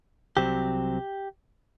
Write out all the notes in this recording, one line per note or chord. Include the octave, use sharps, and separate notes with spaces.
C2 C3 F#3 C4 G4